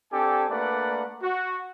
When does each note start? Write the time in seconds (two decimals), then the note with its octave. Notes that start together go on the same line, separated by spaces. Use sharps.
0.12 C4 D4 G4 A4 G#5
0.49 A3 A#3 D4 B4 D5 F#5
1.23 F#4